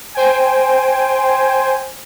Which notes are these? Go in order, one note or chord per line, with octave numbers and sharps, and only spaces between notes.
C5 G5 G#5